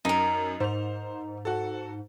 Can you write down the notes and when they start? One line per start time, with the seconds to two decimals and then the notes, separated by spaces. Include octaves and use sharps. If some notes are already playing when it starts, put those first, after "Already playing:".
0.05 F#2 D#4 A#4
0.60 G#2 C5 F7
1.45 F#4 A4